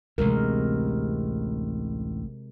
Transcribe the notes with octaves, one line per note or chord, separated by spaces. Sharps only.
A1 D2 C3 G#3 A#4